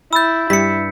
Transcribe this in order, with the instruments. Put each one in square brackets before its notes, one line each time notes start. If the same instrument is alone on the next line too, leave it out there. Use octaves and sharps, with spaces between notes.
[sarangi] E4 [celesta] B5 A6 [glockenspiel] E6 G6
[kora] G2 [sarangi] E4 [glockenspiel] B6 C#7